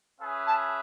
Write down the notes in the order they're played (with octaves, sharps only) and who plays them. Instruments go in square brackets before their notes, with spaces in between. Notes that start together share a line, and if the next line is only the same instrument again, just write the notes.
[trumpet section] C#4 G#4 B4 E5
[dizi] A5